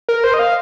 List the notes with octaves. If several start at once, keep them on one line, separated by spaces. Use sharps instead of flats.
A#4
C5
D#5
F5